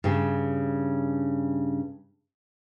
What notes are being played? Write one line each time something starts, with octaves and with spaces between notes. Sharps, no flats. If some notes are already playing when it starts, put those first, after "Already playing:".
G2 C#3